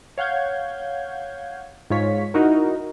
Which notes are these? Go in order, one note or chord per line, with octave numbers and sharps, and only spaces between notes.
C#5 F5 F#5 G6 G#6
G#2 F4 C#5 B6
D#4 E4 F#4 A#4